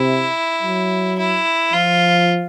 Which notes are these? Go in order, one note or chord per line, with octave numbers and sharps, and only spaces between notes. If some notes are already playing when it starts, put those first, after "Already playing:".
Already playing: C3 E4
F#3
E4
F3 F4